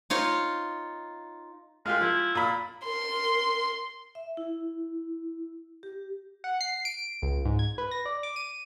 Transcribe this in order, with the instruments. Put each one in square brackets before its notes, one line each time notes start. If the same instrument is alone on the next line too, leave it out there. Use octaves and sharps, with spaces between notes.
[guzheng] D#4 F4 C#5
[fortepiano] G#3 F4 G4 [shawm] F5
[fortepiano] F3 [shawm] E4
[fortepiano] A#2 B5
[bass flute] A#4 [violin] C6
[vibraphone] E5
E4
G4
[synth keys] F#5
C7
D7
C#2
G#2
G#6
B4
A#6
D5
D6
D#7